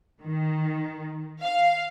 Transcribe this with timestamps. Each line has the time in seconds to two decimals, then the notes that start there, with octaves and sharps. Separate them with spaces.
0.22 D#3
1.43 F5